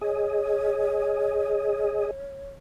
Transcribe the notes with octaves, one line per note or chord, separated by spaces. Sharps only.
G#4 C#5 D#5